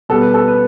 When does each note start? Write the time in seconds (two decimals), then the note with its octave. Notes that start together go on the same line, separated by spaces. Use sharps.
0.09 B2 G3 B3 A4
0.22 B4
0.34 A4
0.48 B4